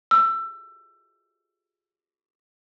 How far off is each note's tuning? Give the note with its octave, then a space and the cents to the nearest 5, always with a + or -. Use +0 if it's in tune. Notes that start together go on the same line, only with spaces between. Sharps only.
E6 +25